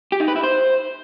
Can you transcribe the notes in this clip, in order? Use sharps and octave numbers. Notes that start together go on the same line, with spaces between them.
G4
D#4
B4
E4
C5